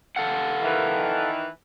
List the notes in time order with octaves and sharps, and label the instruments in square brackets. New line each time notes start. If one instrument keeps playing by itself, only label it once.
[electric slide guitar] A4 F5 F#5
[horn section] D#3 E3